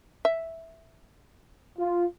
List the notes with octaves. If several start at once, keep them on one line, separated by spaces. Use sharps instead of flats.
E5
F4